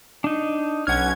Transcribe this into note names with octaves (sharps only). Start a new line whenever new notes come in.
D4 D#4
B1 C#4 F#5 F6 G#6